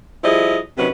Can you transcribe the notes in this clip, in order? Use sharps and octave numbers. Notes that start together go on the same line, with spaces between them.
F3 G3 E4 G#4 D#5
C3 D#3 F#3 C#4 B4